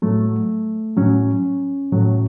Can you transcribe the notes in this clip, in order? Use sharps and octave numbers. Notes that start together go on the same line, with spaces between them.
A2 F#3 A3
A2 F#3 C#4
A2 F#3